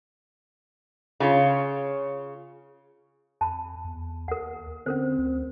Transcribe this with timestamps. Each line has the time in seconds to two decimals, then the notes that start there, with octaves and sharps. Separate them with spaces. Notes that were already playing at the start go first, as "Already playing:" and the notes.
1.20 C#3 F4 C#5
3.41 F2 A5 B5
3.85 E2
4.28 D#2 A#4 F#5
4.86 D3 C4 C#4 A#4 C5
5.19 D2